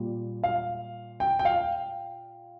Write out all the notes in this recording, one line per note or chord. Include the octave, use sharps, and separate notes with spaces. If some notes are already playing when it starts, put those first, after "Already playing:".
Already playing: A#2 G3
F5
G5
G5
F5